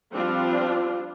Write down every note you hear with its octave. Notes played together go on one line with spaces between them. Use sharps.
F3 G3 C4 D4 F4